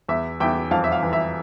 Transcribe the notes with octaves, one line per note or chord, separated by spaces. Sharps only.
E2 E5
E2 E5 G5
F2 F5 A5
E5
F5
E3
E5